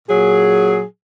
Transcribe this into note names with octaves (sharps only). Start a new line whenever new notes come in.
A#2 F#3 G#4